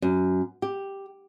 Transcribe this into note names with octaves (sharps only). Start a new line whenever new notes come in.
F#2
G4